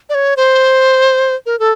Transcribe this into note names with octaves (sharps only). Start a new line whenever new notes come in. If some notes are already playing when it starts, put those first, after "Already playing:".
D5
C#5
C5
A#4
A4